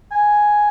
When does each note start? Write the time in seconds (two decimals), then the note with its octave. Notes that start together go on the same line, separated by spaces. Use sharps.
0.11 G#5